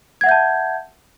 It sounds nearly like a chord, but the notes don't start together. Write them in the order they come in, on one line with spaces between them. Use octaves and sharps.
G#6 F#5 E5 G6 A5